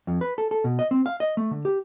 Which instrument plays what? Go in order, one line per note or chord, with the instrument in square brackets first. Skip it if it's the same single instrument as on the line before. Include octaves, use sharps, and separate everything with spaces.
[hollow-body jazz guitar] F2
B4
A4
A4
B2
D#5
C4
F5
D#5
A3
D3
G4